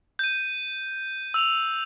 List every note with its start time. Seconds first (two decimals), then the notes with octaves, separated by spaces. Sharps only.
0.19 G6 D#7
1.34 E6 F7 F#7